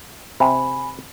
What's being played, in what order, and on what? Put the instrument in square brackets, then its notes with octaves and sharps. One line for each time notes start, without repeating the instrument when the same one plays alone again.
[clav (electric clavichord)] C3 [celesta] G#5 B5